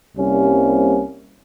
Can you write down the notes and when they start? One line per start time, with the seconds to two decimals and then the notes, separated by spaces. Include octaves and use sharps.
0.17 C2 C3 G3 A#3 C#4